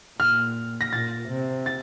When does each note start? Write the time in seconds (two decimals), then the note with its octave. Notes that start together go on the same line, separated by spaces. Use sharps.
0.19 A#2 F6
0.81 A#6
0.92 A#2 A6
1.29 C3
1.66 A6